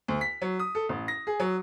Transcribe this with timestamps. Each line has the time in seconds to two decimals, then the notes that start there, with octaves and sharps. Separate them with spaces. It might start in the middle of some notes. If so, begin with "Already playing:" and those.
0.08 D2
0.21 B6
0.42 F#3
0.59 D#6
0.75 A4
0.89 A1
1.08 A#6
1.27 G#4
1.40 F#3